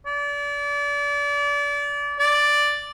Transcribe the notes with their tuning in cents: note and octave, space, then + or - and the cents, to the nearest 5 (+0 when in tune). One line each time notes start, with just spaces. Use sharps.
D5 -30
D5 +0